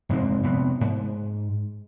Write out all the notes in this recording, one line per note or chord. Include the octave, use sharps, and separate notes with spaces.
F1 G#2 G#3 C4
F1 B3 C4
G#2